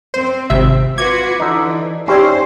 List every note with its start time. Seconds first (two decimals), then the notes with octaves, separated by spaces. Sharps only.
0.14 C4 C5
0.50 G#1 C3 E5
0.98 F4 F#4 B4 D6 G#6
1.40 D3 E3 D#4
2.08 C4 C#4 D#4 E4 G4 C5 D5